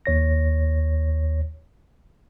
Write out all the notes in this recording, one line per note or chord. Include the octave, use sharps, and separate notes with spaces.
D#2 C#5 A#6